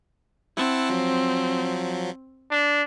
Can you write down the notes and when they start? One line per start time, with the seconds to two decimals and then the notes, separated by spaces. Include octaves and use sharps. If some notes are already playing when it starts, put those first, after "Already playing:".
0.57 C4 E4 F#5 A5
0.90 F3 F#3
2.51 D4